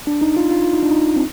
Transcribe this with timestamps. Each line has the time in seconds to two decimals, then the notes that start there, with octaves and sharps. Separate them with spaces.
0.07 D4
0.21 D#4
0.37 F4
0.51 F4
0.64 F4
0.74 D#4
0.83 D4
0.91 D#4
1.16 C4